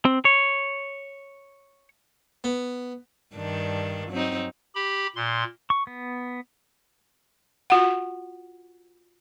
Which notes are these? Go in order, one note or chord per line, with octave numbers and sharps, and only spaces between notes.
C4
C#5
B3
G2 D#3 D4
F#3 C4 D#4
G4 B5
A#2 C6
C#6
B3
F4 F#4 F#5